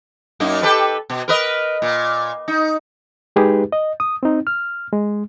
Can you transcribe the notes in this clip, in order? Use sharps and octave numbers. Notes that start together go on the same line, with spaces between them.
F#2 A#3 D#4
G4 A4 B4
B2
A#4 B4 D#5
A#2
D#4
G#3 D#4 G4 G#4 B4
D#5
D#6
C4 D#4
F6
G#3